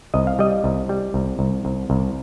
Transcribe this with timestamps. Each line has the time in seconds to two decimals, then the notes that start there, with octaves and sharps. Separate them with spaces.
0.14 C2 D#5
0.27 F5
0.39 G3 D#5
0.64 C2
0.89 G3
1.14 C2
1.39 C2
1.65 C2
1.90 C2